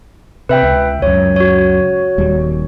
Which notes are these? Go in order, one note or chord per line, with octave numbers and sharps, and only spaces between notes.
C3 B4 E5 G5
C#2
C#2 F#2 C#5
F#4 C#5
D#1 D#2 G3